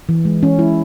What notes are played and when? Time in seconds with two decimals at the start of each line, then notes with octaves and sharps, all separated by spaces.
0.09 E3
0.25 G#3
0.42 E3 C#4
0.59 G#3 E4